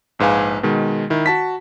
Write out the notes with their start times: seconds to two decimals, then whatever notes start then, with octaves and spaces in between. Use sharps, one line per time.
0.19 A#1 G#2 B4 F5 G#5
0.63 B2 D#3 G#3
1.10 D#3 E4
1.26 F#4 A5 B6